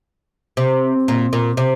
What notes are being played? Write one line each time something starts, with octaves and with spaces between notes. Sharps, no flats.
C3
A#2
A#2
C3